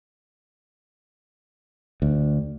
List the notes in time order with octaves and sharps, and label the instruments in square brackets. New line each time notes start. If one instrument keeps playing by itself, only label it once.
[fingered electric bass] D2